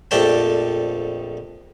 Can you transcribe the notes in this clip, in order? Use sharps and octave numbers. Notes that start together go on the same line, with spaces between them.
A#1 F2 A3 D5 G5 A5